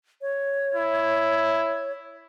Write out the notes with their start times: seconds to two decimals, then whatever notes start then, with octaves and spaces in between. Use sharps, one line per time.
0.21 C#5
0.75 E4